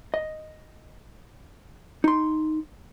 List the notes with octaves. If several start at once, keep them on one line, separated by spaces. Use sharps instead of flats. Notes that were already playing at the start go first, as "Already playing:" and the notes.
D#5
D#4 C6